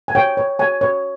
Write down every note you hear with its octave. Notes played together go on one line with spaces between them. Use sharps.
G#5
C#5 G5
C#5
C#5 G#5
C#5